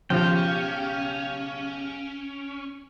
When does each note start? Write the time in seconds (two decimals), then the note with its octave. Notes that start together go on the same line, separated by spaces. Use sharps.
0.10 B1 C#3 F3 C#4 F4 G4 G5